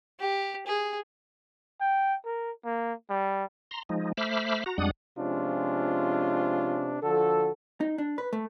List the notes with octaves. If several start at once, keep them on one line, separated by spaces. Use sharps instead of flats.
G4
G#4
G5
A#4
A#3
G3
A#5 C6
F3 G#3 D#4
A3 C5 E5 B5 D6 F6
F#4 A#5
F2 G3 G#3 D4 F#5 D#6
C3 F3 G#3 C#4 D4 F4
D3 F3 F#4 A4
D#4
D4
B4
A3